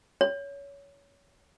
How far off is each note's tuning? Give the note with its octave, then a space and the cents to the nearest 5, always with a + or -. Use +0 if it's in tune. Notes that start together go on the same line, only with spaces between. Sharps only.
C#5 +20